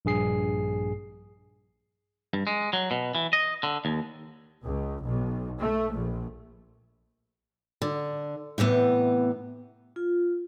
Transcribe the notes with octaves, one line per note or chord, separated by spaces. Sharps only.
A#1 G2 G#4 C7
G2
G#3
F#3
B2
E3
D#5
D3
D#2
C#2
B1
A3
A#1
D3
A2 C3 E3 B3
F4